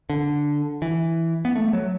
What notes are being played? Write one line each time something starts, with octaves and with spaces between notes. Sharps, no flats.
D3
E3
B3
A3
F#3